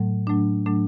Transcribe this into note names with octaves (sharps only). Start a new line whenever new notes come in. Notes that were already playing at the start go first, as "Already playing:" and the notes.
Already playing: A2 F#3 A3
A2 F#3 A3 D4
A2 F#3 A3 D4